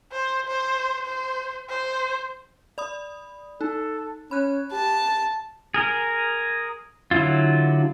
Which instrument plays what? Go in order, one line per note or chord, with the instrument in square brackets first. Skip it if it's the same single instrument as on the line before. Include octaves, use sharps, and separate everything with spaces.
[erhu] C5
C5
C5
C5
[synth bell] D5 B5 D#6
[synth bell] D#4 [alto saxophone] A4
[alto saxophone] C#4 [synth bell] B5 F#6
[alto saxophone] G4 [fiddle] A5
[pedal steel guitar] G#4 A#4
D3 F#3 E4 F4